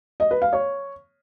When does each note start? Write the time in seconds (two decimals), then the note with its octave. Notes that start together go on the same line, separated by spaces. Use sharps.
0.20 D#5
0.31 B4
0.42 F5
0.53 C#5